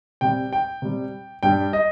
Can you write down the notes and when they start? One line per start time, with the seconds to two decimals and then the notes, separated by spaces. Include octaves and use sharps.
0.21 C3 G3 G5
0.53 G5
0.82 C3 G3
1.43 G2 G3 G5
1.73 D#5